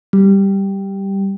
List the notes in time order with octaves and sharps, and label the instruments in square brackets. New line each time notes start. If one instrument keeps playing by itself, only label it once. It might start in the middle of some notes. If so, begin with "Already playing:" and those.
[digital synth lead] G3